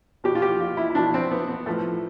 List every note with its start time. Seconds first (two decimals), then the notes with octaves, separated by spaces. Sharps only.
0.24 B2 G4
0.35 F4
0.42 G4
0.61 F4
0.77 E4
0.90 E4
0.95 B2 D4
1.14 C4
1.31 B3
1.48 B3
1.66 A2 F3 A3